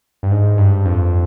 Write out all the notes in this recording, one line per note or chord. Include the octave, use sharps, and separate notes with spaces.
G2
G#2
G2
F2